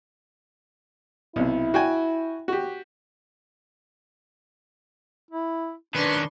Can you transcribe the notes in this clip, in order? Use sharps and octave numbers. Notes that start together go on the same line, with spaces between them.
B1 C3 E4
F#4 G5 G#5
F#4 G4
E4
D#3 C#4 D4 B4 C6 C#6